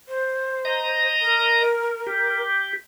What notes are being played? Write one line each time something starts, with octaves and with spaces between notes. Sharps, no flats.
C5
D#5 A#5
A#4
G4